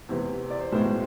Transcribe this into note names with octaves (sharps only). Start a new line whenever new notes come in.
E2 C3 E3
D5
C5
B1 A2 E3 G#3 C5